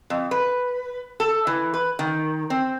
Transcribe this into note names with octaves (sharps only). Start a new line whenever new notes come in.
F2
B4
A4
E3
B4
D#3
C4